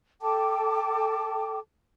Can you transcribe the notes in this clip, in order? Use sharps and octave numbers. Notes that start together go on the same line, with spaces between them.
A4 G5 A5 D6